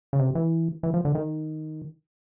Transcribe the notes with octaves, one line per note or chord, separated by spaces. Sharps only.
C#3
C3
E3
E3
F3
D3
D#3